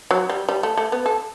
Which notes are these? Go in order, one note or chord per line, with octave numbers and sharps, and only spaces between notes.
F#3
G3
G3
A3
A3
B3
A4